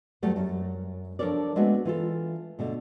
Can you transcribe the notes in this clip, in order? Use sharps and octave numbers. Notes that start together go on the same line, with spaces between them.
E2 F#3 G3 A3 F#5
F#2
F3 D4 A4 A#4 C#5 D5
G#3 A3 B3 C4 D4 F#4
E3 F4 A4
B2 D3 A3